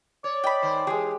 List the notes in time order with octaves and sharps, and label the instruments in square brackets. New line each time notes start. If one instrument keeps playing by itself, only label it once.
[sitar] C#5 [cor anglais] D5
[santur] D#5 [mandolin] G5 B5
[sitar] G#2 D#3 C5
[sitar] E3 [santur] G#3 G4 [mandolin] G#4